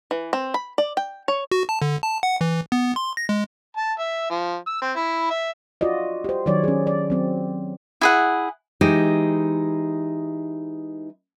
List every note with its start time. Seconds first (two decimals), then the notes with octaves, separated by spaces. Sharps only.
0.11 E3
0.33 C4
0.54 B5
0.78 D5
0.97 G5
1.28 C#5
1.52 F#4
1.69 A5
1.82 D3
2.03 A5
2.23 F#5
2.41 E3
2.72 B3
2.96 C6
3.17 A#6
3.29 G#3
3.77 A5
3.99 E5
4.30 F3
4.67 E6
4.81 C4
4.96 E4
5.30 E5
5.81 F4 F#4 D5 D#5
6.24 G4 C5
6.46 D#3 F#3 C#5 D5
6.64 C#4 G#4
6.87 D5
7.10 F#3 C4
8.01 E4 G#4 F#5
8.81 E3 G#3 D#4 G4 D#5